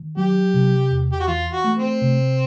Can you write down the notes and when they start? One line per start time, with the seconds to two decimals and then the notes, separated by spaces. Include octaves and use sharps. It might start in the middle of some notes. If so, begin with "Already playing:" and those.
Already playing: D#3
0.17 F#3 G4
0.54 C3
0.91 E2
1.13 G4
1.20 F#4
1.28 E3 F4
1.53 F#4
1.64 A3
1.78 C4
2.02 C3